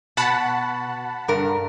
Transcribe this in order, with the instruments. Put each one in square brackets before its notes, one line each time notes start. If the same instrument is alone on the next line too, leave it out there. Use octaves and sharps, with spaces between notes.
[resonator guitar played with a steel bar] B2 [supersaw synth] F#5 A5 B5
[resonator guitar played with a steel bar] G2 A#4